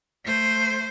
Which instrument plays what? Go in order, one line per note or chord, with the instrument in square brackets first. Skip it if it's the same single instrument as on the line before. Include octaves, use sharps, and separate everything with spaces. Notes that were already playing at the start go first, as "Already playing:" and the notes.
[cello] A3 C5